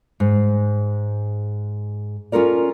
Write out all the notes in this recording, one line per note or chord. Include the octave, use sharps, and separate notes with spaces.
G#2
C#4 F4 A4 A#4 D5